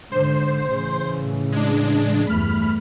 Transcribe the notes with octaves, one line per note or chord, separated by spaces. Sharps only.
G#2 D3 C5
A2 C#3 E3
G#3 D4
E2 G2 A3 B5 F6